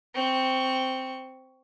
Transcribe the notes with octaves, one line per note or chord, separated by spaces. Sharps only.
C4 C#6